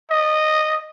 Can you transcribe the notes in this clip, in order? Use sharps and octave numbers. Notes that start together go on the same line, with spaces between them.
D#5